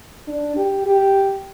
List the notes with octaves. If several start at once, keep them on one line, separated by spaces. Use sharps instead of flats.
D4
G4
G4